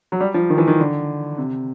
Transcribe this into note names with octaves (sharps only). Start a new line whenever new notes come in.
F#3
G3
F3
D#3
E3
D#3
D3
C3